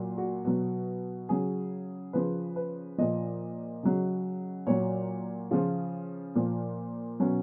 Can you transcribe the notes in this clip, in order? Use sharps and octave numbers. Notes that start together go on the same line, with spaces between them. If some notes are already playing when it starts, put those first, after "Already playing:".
Already playing: A#2 F#3
F#4
B2 F#3
C#3 F#3 G#4
C#3 F3 B4
B4
A#2 F3 D#5
C#3 F#3
A#2 F#3 C#5
C#3 F3 F4
A#2 F3
B2 F#3 C#4